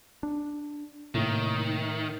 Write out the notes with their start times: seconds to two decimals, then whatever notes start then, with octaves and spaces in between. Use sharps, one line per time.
0.23 D4
1.15 A2 C3 D#3 A#3